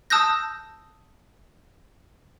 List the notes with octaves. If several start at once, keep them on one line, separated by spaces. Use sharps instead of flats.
A5 D#6 E6 F#6 G6 A#6